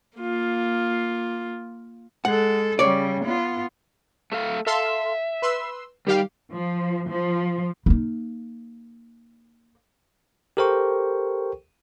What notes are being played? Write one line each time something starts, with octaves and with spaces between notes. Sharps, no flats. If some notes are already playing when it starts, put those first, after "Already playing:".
A#3 F4
G#3 A4 F#5
C#3 G3 C#5 D5
B3 F4
A3 A4 F5
A4 E5 F5 C6
B4 C6 E6
D#3 G3 G4 F5
F3
F3
A#3 D#4
G4 A4 A#4 C5 G5 C#6